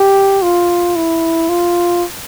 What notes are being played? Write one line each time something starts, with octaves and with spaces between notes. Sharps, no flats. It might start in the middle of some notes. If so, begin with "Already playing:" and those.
Already playing: G4
F4
E4
F4